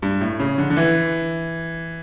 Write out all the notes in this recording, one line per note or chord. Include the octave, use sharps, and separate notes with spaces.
G2
A2
C#3
D3
D3
E3